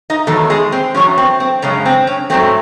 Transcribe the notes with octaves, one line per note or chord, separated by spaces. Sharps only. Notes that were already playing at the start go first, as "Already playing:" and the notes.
D#4 D#5
E2 D#3 F#3 A3 A4
G#3 G#4
C4
E2 D#3 F#3 C#4
C4
C4
F#2 C#3 G#3 C#4
C4
C#4
G#2 F#3 A3 C4